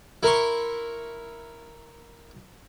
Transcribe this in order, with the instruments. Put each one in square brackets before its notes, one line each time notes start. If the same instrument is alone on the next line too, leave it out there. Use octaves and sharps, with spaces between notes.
[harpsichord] E4 A#4 C6 C#6